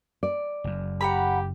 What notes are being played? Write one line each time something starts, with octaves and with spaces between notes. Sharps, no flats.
D5
F#1 F#2
G4 F#5 A#5 B5